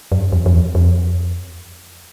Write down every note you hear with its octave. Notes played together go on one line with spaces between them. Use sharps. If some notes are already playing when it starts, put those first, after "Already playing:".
F#2
F2
F2
E2
F2